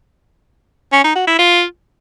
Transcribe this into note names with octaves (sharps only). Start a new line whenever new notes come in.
C#4
D#4
F#4
E4
F4